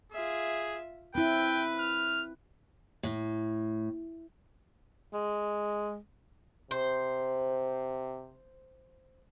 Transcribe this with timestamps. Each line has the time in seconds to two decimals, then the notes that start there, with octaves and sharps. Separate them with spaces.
0.12 F4 G#4 E5
1.15 C4 E4 B4 G5
1.79 F6
3.03 A2
5.13 G#3
6.71 C3 C5